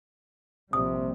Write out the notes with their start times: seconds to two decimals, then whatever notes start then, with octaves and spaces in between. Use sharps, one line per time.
0.73 A#1 C3 G3 D#6